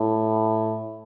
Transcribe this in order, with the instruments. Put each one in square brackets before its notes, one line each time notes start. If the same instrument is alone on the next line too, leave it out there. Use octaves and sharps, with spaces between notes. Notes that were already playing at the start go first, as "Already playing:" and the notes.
Already playing: [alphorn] A2